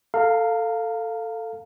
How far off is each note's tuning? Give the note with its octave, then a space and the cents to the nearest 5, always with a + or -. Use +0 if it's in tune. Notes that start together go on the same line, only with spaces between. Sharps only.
A4 +15 F5 +0 A#5 -30